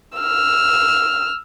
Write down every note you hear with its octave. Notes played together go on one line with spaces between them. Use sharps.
E6 F6